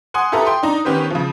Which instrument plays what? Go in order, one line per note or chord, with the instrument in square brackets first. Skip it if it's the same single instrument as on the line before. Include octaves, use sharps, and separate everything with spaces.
[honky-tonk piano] F#5 G#5 C6 D#6
E4 F4 G4 A4 B4 A#5
G5 C6
D4 D#4 A#5
D#3 B3 C#4 G4 B4 C5
C#3 F3